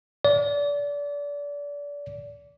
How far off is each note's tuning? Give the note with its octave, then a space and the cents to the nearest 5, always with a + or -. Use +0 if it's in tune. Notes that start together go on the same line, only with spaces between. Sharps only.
D5 -30